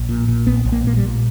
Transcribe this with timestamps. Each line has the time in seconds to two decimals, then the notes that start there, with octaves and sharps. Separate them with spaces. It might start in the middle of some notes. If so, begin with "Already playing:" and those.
Already playing: A#1
0.09 A#2
0.28 A#2
0.47 A#1 B3
0.65 A#1
0.72 A#3
0.84 A#2 A#3
0.97 G3
1.04 A#2